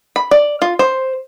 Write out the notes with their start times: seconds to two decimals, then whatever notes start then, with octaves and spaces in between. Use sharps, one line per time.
0.16 B5
0.31 D5
0.62 F4
0.79 C5